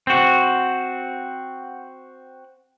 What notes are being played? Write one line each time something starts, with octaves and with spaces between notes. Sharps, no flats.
C4 F#4